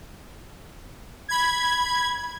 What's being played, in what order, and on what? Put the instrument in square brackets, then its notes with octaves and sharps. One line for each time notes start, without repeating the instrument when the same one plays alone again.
[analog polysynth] B5 G#6